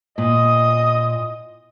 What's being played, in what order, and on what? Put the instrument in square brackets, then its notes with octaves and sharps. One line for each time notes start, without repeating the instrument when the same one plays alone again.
[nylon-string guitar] A#2 [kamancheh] D#5 D#6